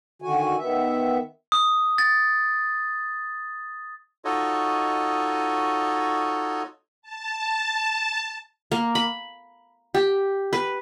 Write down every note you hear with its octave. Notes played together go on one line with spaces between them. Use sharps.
D3 D#3 F#4 G#5
D#3 B3 E5
D#6
A6
D#4 F4 F#4 A4 C#5 D#5
A5
A#3
B5
G4
B4